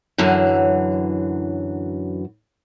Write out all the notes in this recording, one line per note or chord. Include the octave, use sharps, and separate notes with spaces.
F#2 D3 E3 F#3